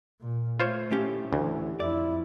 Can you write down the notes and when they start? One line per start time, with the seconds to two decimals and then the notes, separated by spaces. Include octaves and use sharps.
0.21 A#2
0.60 A3 F4 C5 C#5
0.91 A2 C#4 G4
1.33 D2 E3
1.80 F2 E4 D5